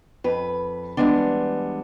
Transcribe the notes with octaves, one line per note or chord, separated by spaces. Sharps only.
F2 B4
E3 F3 G3 G#3 B3 D4